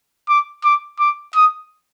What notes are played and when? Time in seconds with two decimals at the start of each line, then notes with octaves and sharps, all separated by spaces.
0.29 D6
0.64 D6
0.99 D6
1.35 D#6